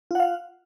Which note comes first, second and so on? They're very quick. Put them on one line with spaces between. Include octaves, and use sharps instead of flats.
F4 F#5 F5